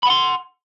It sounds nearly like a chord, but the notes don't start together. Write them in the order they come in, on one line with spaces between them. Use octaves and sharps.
B5 F#5 C6